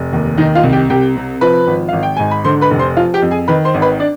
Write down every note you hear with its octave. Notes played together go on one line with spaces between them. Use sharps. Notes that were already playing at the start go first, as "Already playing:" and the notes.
Already playing: F1
D#2
D#3 D#4 D#5
F4 F5
C2
G4 G5
C2 G4 G5
C3
F3 B4 B5
G#1
G#1 F5
G5
G#2 G#5
B5
D3 C5 C6
B4 B5
F1
C5 C6
F3 F4 F5
G4 G5
F2
G#4 G#5
D#3 B4 B5
C5 C6
G#1
B4 B5
D4 D5